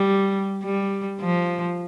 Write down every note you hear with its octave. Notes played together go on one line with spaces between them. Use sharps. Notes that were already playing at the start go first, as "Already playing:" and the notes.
Already playing: G3
G3
F3